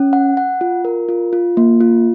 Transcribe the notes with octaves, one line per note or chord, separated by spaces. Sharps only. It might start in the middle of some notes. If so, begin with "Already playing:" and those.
Already playing: C#4
F#5
F#5
F4
A#4
F4
F4
A#3
F4